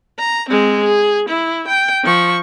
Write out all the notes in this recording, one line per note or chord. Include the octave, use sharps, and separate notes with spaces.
A#5
G#3 C4
G#4
E4
G5
F3 C#6